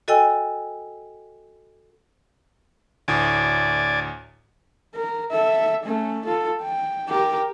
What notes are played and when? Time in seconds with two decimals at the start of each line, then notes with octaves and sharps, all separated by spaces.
0.08 F#4 A4 D#5 G5 G#5 E6
3.08 D2 A2 D5 G#5
4.95 A#4
5.31 A4 E5
5.83 A3 C#4
6.25 F4 A4
6.62 G5
7.09 G4 A#4